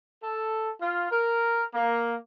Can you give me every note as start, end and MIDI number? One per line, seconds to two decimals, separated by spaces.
0.22 0.70 69
0.80 1.06 65
1.11 1.63 70
1.73 2.16 58